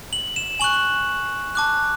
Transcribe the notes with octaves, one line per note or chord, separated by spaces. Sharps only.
F#7
E7
G#5 C#6 F#6 F#7
A5 D6 F#6